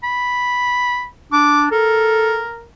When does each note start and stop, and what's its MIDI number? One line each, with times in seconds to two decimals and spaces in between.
0.03 1.06 83
1.33 1.70 62
1.33 1.65 86
1.72 2.42 69
1.72 2.66 70